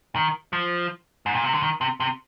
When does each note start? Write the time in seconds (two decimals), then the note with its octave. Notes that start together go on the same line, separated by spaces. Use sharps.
0.16 D#3
0.53 F3
1.26 G#2
1.35 A#2
1.44 C3
1.54 D3
1.62 D#3
1.81 C3
2.00 C3